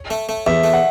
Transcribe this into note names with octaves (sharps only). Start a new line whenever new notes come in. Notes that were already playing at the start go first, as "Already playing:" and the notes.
Already playing: C#5
A3
A3
E2 E5
A3
F#5